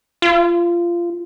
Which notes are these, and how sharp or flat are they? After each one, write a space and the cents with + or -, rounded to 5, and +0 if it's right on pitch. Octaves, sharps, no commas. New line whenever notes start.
F4 -20